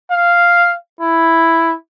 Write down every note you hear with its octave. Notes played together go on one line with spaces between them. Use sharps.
F5
E4